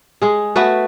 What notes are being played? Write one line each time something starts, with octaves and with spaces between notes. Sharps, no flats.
G#3 G#4
A3 B3 F#4 B4